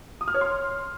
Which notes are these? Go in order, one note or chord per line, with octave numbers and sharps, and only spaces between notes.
D#6
F6
C#5
C6